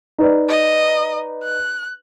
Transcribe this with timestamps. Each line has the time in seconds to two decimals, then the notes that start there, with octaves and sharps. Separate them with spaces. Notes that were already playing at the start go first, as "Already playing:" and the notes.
0.18 D#4 B4 D5
0.49 D#5
1.44 F#6